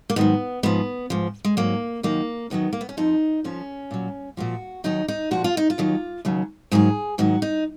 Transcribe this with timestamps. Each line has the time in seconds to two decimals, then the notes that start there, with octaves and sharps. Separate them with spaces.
0.10 A#3
0.16 G#2 D#3 F#3 B3
0.63 G#2 F3 B3
1.10 G#2 F3
1.45 G#3
1.57 G#2 F#3 A#3
2.03 F#2 D#3 F#3 A#3
2.50 F#2 D#3 F#3 B3
2.73 A#3
2.81 B3
2.89 C#4
2.97 F2 F3 D#4
3.44 F2 F3 C#4
3.91 A#2 F#3
4.37 A#2 F3 F#4
4.84 D#2 D#3 F#3 D#4
5.08 D#4
5.31 A#2 F3 F#4
5.44 F4
5.57 D#4
5.70 F4
5.78 D#2 D#3 F#3
6.25 D#2 C#3 F#3
6.71 G#2 D#3 F#3 G#4
7.18 G#2 D#3 F#3 F#4
7.42 D#4